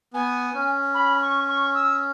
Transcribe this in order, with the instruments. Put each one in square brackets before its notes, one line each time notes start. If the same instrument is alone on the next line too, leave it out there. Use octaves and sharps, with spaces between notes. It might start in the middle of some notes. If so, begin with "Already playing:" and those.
[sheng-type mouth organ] B3 [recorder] G#5
[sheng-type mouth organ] C#4
[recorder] B5
C#6
C#6
E6